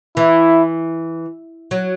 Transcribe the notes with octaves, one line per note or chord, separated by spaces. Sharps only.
E3 E4
F#3